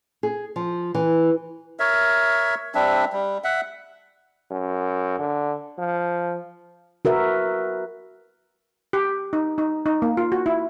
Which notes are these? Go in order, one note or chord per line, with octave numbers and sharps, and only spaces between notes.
G#4
F3
E3
A#4 C#5 E5
G3 C4 D4 E5
G3
E5 F#5
F#2
D3
F3
F#4 A#4 B4 E5
G4
D#4
D#4
D#4
A#3
F4
F#4
E4